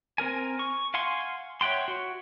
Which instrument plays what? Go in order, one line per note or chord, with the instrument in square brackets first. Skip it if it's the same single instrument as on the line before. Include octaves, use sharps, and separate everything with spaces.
[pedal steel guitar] C4 A#4 G#5
C#6
F5 F#5 G#5 C6 C#6
C#5 E5 F#5 G5 C6
F#4